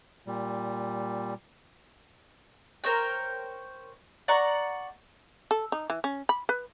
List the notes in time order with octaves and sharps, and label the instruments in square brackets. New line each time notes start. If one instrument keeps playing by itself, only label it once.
[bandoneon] A#2 G3
[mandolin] A#4 C5 C#5 G5
D5 F#5 A#5 C#6
[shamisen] A4
D#4
E3
C#4
B5
B4